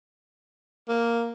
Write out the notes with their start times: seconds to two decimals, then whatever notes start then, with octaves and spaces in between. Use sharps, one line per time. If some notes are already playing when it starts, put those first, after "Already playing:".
0.89 A#3